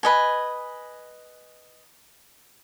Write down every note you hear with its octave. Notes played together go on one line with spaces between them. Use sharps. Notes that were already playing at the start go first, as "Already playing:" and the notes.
B4 D#5 G#5